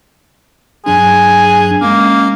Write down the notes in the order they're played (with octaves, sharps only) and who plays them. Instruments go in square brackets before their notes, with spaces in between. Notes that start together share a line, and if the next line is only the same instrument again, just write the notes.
[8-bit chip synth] G2 F#3 D4 [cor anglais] G#4
[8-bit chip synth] G#3 C#4 [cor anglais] A#3